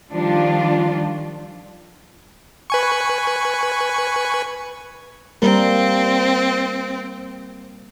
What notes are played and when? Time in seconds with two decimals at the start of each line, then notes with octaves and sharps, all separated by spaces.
0.12 D#3 F3 G3 D4 F4
2.70 B4 G#5 C#6
5.42 G3 A#3 C4 A#4